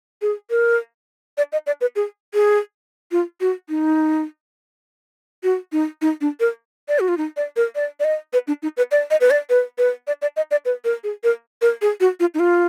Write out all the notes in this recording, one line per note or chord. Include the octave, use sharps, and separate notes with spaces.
G#4
A#4
D5
D#5
D5
B4
G#4
G#4
F4
F#4
D#4
F#4
D#4
D#4
D4
A#4
D5
F#4
F4
D#4
D5
A#4
D5
D5
D#5
B4
D4
D#4
B4
D5
D#5
B4
D5
B4
B4
D5
D5
D#5
D5
B4
A#4
G#4
A#4
A#4
G#4
F#4
F4
D#4
F4